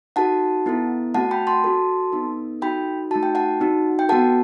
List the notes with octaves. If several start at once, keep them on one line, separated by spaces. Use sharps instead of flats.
D#4 F#4 A4 F#5 A5
B3 E4 A4
A3 C4 F#4 F#5 A5
G5 B5
A5 C6
C4 F#4 A4
B3 D#4 A4
D#4 F#4 A4 G5 B5
A3 D#4 F#4 A5
G5
F#5 A5
C4 D#4 F#4
G5
B3 F#4 A4 F#5 A5